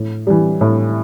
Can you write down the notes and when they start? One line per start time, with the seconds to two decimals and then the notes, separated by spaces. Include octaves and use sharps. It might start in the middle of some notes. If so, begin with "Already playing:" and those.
Already playing: A2
0.27 E3 G3
0.61 A2